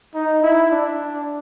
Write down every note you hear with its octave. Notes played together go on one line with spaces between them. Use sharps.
D#4
E4
D4